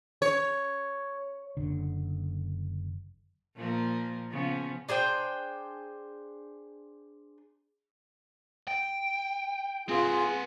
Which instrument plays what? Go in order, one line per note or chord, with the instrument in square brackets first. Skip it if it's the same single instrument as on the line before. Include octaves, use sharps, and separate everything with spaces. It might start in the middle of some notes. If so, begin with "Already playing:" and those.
[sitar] C#5
[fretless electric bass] F#1 D3
[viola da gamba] A#2 F3 A#3
C#3 F3 B3
[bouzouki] D4 G#4 C5 G5
[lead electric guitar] G5
[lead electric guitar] C4 B4 [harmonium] F4 G#4